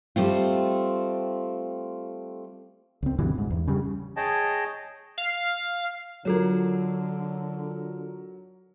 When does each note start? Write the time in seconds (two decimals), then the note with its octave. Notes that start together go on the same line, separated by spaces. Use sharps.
0.16 G3 A3 C4 F4
3.03 C#2 C4
3.19 D2 G2 B2 E3
3.38 G#2
3.50 E2
3.67 C#3 G3
4.17 G#4 C#5 D#5 G5 A5
5.18 F5
6.25 D3 F#3 F4 A4 A#4 C#5